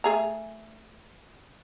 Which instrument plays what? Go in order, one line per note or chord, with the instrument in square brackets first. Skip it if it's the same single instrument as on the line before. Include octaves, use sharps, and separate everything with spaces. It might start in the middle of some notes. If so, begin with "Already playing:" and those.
[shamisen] A3 G#4 A#5